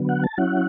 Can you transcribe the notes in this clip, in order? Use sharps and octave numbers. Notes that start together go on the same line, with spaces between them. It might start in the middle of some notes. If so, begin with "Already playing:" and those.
Already playing: D3 F#3 B3
F#5
A5
F#3 C#4 E4 F#5